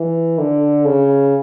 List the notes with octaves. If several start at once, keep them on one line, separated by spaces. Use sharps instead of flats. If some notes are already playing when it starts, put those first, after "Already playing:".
Already playing: E3
D3
C#3